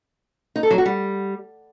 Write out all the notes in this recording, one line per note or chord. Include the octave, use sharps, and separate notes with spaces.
D#4
A4
F#3
F#4
G3